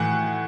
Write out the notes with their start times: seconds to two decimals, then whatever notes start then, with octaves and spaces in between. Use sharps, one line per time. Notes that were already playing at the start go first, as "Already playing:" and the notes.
Already playing: A2 E3 F#5